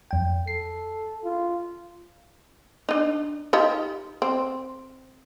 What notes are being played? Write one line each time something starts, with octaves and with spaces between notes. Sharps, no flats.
F2 G5
A4 C7
F4
D4 D#4
D#4 F4 G4
C4